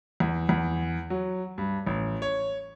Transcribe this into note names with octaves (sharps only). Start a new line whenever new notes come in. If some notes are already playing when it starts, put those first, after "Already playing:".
E2
E2
F#3
G2
A1
C#5